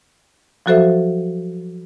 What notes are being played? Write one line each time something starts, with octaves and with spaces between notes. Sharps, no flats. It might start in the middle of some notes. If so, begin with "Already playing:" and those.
F3 F#3 F#4 A4 C5 E5